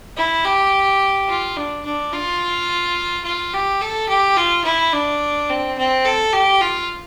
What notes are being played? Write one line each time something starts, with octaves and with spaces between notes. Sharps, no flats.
E4
G4
F4
D4
D4
F4
F4
G4
A4
G4
F4
E4
D4
C4
C4
A4
G4
F4